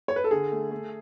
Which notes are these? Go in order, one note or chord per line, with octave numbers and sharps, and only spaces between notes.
C#5
B4
A4
D3 G#4
A3
A3